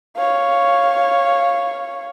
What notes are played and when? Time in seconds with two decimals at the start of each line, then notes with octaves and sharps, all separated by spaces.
0.17 C#5 F5